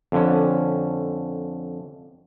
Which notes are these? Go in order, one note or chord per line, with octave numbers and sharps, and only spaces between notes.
F2 D3 C#4